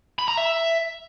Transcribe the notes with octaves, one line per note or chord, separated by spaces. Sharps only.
B5
A#5
E5